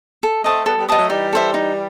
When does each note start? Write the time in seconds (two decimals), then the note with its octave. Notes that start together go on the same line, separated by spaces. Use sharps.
0.23 A4
0.44 A3 C4 D#5 A5 D#6
0.66 G3 B3 A4
0.77 G3 B3
0.88 G3 B3 D#5 A5 D#6
0.99 F#3 A3
1.10 E3 G3 D#4
1.33 A4 C5 E5
1.54 D#4